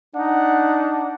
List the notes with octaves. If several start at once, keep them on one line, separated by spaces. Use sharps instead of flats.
D4 D#4 F#5